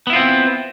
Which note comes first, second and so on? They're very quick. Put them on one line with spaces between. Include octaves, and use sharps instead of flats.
B3 E4 F4 C4